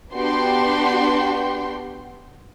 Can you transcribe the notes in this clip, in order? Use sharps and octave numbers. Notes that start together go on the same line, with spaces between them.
B3 D4 F#4 G4 G5 C6